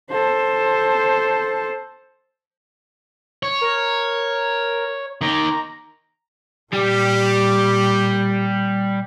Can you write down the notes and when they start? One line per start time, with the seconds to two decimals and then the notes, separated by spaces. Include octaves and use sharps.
0.11 A4 C5
3.43 C#5
3.61 A#4
5.21 D#3 G4 A#5
6.73 A#2 G3 G4